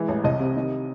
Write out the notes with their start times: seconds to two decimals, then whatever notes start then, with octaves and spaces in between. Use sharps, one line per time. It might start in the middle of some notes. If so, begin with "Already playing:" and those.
Already playing: E3 G#3
0.08 A1
0.24 C2 D#5
0.40 C3
0.56 D#3